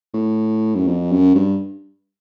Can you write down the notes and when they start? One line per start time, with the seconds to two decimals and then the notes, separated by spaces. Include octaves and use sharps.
0.14 A2
0.75 F#2
0.87 F2
1.12 F#2
1.35 G2